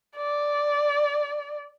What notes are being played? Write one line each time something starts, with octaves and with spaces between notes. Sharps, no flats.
D5